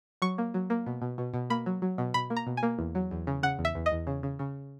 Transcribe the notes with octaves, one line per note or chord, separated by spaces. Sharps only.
F#3 C#6
A#3
F#3
A#3
B2
B2
B2
B2
A#3 B5
F#3
F#3
B2
B2 B5
A#3
A#5
B2
G#5
A#3
E2
F#3
E2
C#3
C#3 F#5
E2
E5
E2
D#5
E2
C#3
C#3
C#3